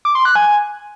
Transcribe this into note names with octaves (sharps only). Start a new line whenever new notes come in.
D6
C6
F#6
G#5